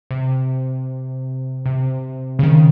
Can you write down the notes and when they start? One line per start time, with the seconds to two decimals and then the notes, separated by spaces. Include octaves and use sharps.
0.11 C3
1.66 C3
2.39 C#3
2.43 D#3